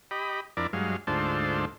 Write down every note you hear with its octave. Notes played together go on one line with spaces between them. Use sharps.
G4 D#5 B5
F2 D4 E4 A#4 D5
G2 F#3 G#3 F5
D2 G#2 D4 F4 A4 C5